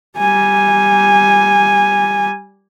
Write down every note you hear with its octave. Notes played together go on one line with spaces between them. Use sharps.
G3 G#5